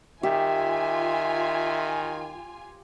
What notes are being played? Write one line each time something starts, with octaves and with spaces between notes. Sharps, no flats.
D#3 F4 G4 E5 G#5